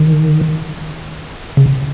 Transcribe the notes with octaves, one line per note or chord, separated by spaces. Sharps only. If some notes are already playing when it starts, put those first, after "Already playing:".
Already playing: D#3
C#3